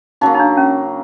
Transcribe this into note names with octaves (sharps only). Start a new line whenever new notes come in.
C#3 F#3 A#3 D#4
D#4
D4
C#4